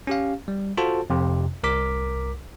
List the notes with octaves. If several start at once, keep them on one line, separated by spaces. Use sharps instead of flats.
C#4 G4 F5
G3
F4 F#4 A4 C5 A5
F2 C3
C2 A#4 D6 B6